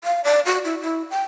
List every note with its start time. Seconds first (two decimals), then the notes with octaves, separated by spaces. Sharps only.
0.04 F5
0.24 D5
0.46 F#4
0.65 E4
0.81 E4
1.10 G5